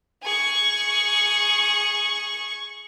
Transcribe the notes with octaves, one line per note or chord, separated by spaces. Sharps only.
G#4 C#6